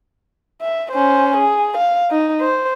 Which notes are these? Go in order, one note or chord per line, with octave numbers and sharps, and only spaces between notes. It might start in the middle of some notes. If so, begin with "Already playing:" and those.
E5
C#4 C5
G#4
F5
D#4
C5